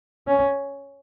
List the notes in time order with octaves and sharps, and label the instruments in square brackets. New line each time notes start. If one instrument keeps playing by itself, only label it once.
[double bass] C#4